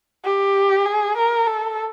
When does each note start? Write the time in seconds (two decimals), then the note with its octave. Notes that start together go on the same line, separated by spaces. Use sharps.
0.24 G4
0.86 G#4
1.17 A#4
1.47 A4